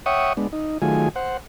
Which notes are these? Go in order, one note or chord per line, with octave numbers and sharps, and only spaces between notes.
C#5 E5 F#5 G5 C#6 D#6
G#3 B3 D4
D#4
D#3 F#3 A3 F4 G#4 G#5
C5 F#5